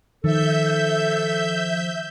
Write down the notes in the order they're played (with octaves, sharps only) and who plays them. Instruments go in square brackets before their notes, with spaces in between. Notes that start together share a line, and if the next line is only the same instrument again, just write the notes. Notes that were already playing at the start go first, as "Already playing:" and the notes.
[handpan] D#3 [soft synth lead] F3 [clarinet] A4 [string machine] E5 G6